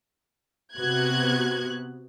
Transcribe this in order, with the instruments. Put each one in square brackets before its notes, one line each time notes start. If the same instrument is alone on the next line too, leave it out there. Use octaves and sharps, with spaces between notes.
[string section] C3 B3 F#4 F#6 G#6